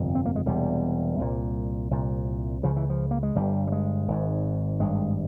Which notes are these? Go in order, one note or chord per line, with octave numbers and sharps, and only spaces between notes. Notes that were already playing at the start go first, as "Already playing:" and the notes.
Already playing: G1 F2 C3
C4
A#3
G#3
E1 E2 C3 G3
C2 A#2
C2 A#2
C#2 C#3 F3
E3
F3
A#3
G#3
G1 G2 G3
G3
G#3
G#1 G#2
G#1 G2 G#3